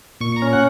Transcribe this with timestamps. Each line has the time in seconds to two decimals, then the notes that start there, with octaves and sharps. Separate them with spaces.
0.21 A#2 C#6
0.36 A#5
0.42 C#4
0.53 F#5